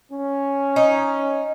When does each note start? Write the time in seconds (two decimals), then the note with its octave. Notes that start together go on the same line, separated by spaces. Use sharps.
0.10 C#4
0.76 D#4